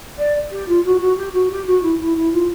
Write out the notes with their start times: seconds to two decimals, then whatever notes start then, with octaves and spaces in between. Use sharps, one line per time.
0.18 D5
0.51 G4
0.68 F4
0.84 F#4
1.00 F#4
1.17 G4
1.33 F#4
1.50 G4
1.66 F#4
1.82 E4
1.99 E4
2.16 E4
2.32 F4